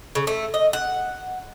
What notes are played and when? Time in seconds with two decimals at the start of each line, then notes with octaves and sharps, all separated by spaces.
0.15 C#3
0.27 A3
0.54 D#5
0.73 F#5